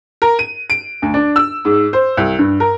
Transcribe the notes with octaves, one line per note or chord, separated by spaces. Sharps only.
A#4
D#7
D7
D2
D4
E6
G#2
C5
C2
G2
A#4